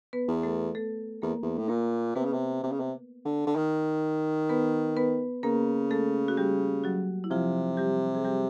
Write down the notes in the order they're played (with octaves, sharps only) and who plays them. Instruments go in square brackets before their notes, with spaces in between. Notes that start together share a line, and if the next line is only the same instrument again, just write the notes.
[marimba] B3 B4
[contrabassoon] E2
[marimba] A3 A4
A3 A4
[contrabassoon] E2 [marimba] A#3 A#4
[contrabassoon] E2
A2
[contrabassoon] A#2 [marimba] A#3 A#4
[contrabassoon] C3 [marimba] B3 B4
[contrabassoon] C#3
C3
C3
C#3
C3
D3
D3
D#3
[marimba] B3 B4
B3 B4
[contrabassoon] C#3 [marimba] A#3 A#4
[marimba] A3 A4
F#4
G3 G4
F#3 F#4
E4
[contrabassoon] C3 [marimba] F3 F4
[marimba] G3 G4
G#4
G3 G4